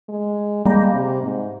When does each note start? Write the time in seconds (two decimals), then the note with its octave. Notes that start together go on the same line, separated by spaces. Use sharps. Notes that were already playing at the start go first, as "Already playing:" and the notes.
0.09 G#3
0.65 G3 G#3 A#3
0.94 C3
1.22 G#2